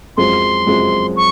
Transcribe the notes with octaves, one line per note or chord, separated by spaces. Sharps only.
F#2 F3 G#3 C4 C6
F#2 F3 G#3 C4
C#6